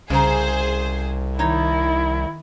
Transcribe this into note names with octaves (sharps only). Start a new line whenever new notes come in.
C2 C#3 G#4 C5 A#5
D#3 D#4 E4 C#5